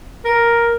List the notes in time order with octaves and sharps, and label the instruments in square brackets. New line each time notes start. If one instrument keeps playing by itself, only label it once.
[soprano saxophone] A#4